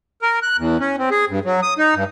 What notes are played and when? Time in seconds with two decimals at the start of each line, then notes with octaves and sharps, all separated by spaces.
0.22 A#4
0.42 F#6
0.58 E2
0.80 C#4
0.98 C4
1.11 G#4
1.29 G2
1.45 F#3
1.63 D#6
1.78 D#4
1.95 G2